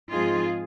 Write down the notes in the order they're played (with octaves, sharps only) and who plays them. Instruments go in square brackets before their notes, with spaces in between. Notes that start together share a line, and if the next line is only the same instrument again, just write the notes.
[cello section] G#2 F3 C4 D#4 F4 G#4